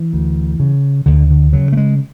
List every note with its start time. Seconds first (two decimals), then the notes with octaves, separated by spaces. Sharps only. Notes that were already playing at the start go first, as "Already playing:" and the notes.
Already playing: E3
0.13 D2
0.60 C#3
1.06 D2 D3
1.30 D3
1.53 C#3 F#3
1.72 A3
1.77 G#3